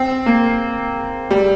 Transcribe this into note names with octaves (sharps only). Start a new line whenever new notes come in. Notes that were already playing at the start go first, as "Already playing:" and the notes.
Already playing: C4
A#3
G3